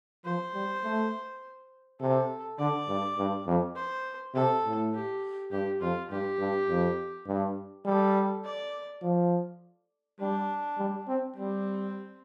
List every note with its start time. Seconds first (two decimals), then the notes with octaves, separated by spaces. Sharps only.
0.25 F3 C5
0.54 G3
0.84 A3
2.01 C3 A4
2.59 D3 D5
2.88 G2
3.18 G2
3.47 F2
3.76 C5
4.35 C3 A4
4.64 A2
4.94 G4
5.51 G2 G4
5.81 F2 F4
6.10 G2 G4
6.39 G2
6.68 F2
7.27 G2
7.85 G3 A4
8.44 D5
9.02 F3
10.20 G3 D4
10.78 G3
11.08 C4
11.36 G3 C4